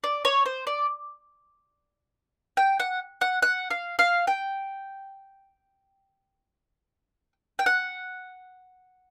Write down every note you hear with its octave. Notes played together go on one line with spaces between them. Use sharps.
D5
C#5
C5
D5
G5
F#5
F#5
F#5
F5
F5
G5
G5
F#5